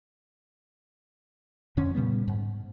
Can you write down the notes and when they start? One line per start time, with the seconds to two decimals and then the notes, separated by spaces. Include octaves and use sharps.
1.77 F2 D3 C#4
1.95 A#2 C#3 G3 B3
2.28 G#2